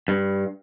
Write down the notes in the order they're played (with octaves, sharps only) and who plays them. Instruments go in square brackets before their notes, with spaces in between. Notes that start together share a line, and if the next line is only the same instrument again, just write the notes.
[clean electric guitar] G2